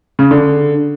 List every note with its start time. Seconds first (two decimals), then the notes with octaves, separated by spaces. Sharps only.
0.19 C#3
0.31 D3